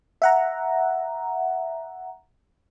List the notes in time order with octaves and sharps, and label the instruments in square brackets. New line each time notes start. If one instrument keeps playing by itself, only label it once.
[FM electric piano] E5 F#5 A#5